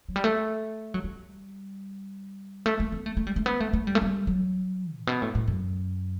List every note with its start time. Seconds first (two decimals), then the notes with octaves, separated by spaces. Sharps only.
0.09 F#3
0.16 G3
0.24 A3
0.94 F#3
1.04 G3
2.66 A3
2.80 A3
2.92 B3
3.06 A3
3.17 A3
3.27 G3
3.36 A3
3.46 B3
3.60 A3
3.73 A3
3.87 G3
3.95 A3
4.02 G3
4.27 F#3
4.97 A2
5.07 B2
5.22 A2
5.35 A2
5.48 F#2